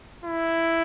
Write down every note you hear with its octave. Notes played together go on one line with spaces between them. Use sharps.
E4